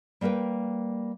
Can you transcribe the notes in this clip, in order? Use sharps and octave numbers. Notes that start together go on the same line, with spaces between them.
G3 A#3 A#4 B4 G5